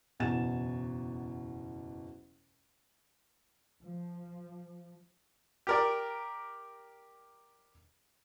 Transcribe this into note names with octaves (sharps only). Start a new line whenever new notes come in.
F#1 E2 B2 G#5 A6 E7
F3
G4 A#4 D5